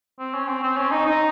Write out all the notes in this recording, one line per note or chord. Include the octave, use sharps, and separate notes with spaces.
C4
C#4
C4
C4
C#4
D#4
D#4